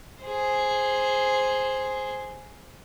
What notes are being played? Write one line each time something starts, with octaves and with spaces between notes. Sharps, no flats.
G#4 C5